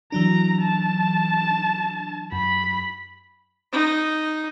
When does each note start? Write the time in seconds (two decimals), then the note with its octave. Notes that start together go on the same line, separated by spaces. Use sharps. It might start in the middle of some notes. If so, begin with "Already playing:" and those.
0.12 E3 F#3 D4 A#5
0.62 A5
2.32 F#2 B5
3.72 D#4